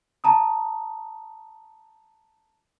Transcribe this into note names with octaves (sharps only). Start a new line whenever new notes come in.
A5 A#5 D#6